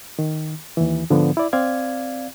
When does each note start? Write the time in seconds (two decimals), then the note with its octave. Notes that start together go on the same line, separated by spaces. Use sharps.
0.19 D#3
0.77 D#2 E3
1.10 G#2 D3 F3 B3
1.37 E4 D5
1.53 C4 D5 F5 G#6